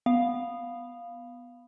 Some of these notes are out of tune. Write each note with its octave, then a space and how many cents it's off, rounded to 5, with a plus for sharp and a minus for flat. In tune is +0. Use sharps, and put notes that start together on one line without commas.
B3 +0 F5 +0